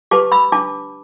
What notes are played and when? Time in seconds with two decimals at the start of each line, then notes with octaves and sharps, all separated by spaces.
0.11 G4 B4 A5 D6
0.32 B5 E6
0.52 D4 A5 D6